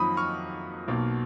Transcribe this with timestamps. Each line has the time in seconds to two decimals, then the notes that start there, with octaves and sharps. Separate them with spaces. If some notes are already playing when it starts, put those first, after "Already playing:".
Already playing: F2 D#3 F#3 A#3 B5 D#6
0.17 C#6 F6
0.88 B1 B2 A#3